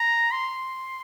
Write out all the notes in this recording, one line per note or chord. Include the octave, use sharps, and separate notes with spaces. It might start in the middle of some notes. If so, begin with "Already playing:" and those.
Already playing: A#5
C6